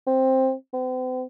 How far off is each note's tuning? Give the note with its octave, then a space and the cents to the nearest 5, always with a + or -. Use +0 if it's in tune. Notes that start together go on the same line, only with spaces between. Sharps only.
C4 +10
C4 -45